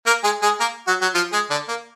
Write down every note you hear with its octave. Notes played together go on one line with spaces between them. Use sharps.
A#3 A#4
G#3 G#4
G#3 G#4
A#3 A#4
F#3 F#4
F#3 F#4
F3 F4
G#3 G#4
D3 D4
A#3